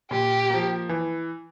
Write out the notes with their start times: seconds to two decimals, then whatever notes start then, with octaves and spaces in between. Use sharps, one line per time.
0.11 A#2 G4
0.50 F3 A#3
0.89 E3